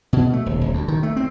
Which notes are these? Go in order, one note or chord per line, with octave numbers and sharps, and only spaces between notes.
B2
A3
D#1
D#1
D2
D#3
A3
C4